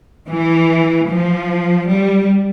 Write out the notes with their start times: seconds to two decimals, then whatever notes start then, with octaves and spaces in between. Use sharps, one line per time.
0.27 E3
1.09 F3
1.90 G3